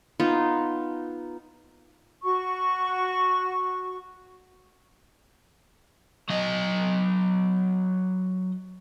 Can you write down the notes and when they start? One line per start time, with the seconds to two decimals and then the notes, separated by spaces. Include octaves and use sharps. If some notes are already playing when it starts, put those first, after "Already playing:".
0.20 B3 D#4 F4
2.23 F#4 C#6
6.30 F#3 D#5